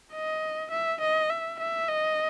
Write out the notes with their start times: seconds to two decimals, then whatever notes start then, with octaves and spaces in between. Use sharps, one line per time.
0.13 D#5
0.71 E5
1.01 D#5
1.30 E5
1.60 E5
1.89 D#5